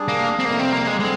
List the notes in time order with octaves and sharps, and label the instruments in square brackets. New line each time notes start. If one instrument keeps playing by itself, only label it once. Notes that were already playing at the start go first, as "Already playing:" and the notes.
Already playing: [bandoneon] G3 D4 G#4
[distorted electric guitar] A#3
C4
[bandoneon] F2 C3 G3 [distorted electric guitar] A#3
[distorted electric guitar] C4
A#3
G#3
[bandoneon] D3 G3 C4 [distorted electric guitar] G#3